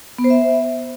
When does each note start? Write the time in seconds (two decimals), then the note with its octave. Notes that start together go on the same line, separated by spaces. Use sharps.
0.18 B3
0.24 C5
0.30 E5